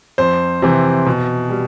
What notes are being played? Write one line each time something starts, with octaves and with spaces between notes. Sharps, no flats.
F2 C5
C3 E3
B2
G3